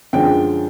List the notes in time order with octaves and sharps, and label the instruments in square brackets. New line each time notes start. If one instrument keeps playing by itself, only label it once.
[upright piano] F#2 D3 F3 G#3 G5